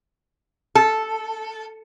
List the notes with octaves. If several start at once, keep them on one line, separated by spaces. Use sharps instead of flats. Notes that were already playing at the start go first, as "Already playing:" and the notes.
A4